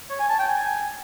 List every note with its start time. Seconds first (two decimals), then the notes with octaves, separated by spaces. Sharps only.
0.10 C#5
0.19 G#5
0.29 A5
0.39 G5
0.48 G#5